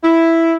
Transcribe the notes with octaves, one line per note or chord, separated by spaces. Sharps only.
E4